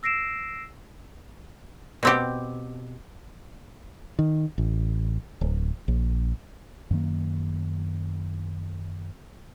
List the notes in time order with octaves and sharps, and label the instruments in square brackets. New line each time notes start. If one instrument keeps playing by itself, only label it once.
[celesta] E6 A#6 C7 D7 E7
[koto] B2 C4 G4
[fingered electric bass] D#3
A1
D1
A#1
F#2 D#3 A#3